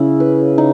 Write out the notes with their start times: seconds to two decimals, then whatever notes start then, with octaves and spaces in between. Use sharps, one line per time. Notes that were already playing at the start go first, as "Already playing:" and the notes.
Already playing: C#3 E4
0.20 B4
0.58 D#4